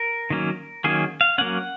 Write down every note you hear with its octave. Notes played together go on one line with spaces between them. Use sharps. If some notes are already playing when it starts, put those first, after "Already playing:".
Already playing: A#4
D#3 F#3 A#3 C#4
D#3 F#3 A#3 C#4 G#4
F5
F#3 A#3 C#4 F#5